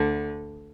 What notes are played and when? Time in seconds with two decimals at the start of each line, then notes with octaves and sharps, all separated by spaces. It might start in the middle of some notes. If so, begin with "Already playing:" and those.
Already playing: D2 D3